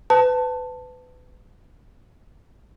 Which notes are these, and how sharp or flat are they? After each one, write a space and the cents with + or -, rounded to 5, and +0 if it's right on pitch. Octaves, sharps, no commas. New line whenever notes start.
B4 +25 A5 +10